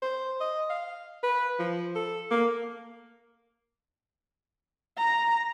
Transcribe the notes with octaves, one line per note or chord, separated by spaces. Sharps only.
C5
D#5
F5
B4
F3
A4
A#3
A#5